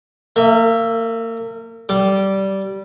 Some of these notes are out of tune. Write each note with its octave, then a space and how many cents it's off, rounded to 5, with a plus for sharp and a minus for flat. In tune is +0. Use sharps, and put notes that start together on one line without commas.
A#3 -35 E5 +0
G3 -15 D6 -5